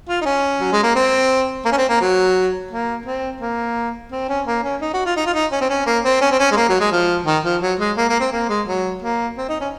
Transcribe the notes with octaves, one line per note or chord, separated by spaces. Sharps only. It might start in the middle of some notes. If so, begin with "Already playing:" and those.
F4
D#4
C#4
F#3
G#3
A#3
C4
A#3
C#4
C4
A#3
F#3
A#3
C4
A#3
C4
C#4
A#3
C#4
D#4
F#4
F4
D#4
F4
D#4
C#4
C4
C#4
A#3
C4
C#4
C4
C#4
G#3
A#3
F#3
G#3
F3
D#3
F3
F#3
G#3
A#3
A#3
C4
A#3
G#3
F#3
A#3
C4
D#4
C#4